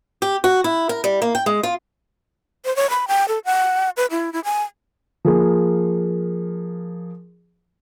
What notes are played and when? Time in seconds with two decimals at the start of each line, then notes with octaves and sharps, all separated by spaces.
0.22 G4
0.44 F#4
0.64 E4
0.89 A#4
1.04 G3
1.22 A#3
1.35 G5
1.46 G#3
1.63 F4
2.65 C5
2.76 C#5
2.90 B5
3.08 G5
3.28 A4
3.45 F#5
3.97 B4
4.11 E4
4.33 E4
4.44 G#5
5.25 F3 A#3 G#4